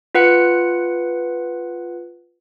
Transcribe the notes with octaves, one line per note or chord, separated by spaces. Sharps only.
F4 B4 F#5 F#6 C#7